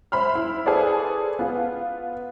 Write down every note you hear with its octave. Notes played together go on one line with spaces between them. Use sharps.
C5 E5 B5 C6 F6
E4
G#4 A4 B4 C5 D5
B3 F4